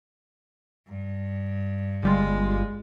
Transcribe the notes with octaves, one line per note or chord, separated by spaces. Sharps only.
G2
G1 G3 G#3 F4